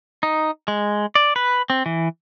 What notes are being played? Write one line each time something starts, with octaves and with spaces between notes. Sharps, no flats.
D#4
G#3
D5
B4
C4
E3